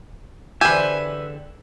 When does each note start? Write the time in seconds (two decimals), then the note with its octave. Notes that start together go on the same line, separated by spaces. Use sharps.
0.61 E2 D3 G4 B4 C5 E5 G#5